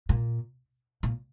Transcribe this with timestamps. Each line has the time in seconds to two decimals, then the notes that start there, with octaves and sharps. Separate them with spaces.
0.09 A#2
1.03 A#2